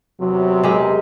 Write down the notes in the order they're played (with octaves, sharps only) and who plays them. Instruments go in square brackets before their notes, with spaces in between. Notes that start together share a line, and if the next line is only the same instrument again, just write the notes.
[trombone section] E2 C3 [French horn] F#3
[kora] G#3 G4 A#4